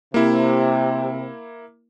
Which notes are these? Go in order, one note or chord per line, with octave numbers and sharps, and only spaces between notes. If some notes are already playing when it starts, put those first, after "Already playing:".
C3 A#3 E4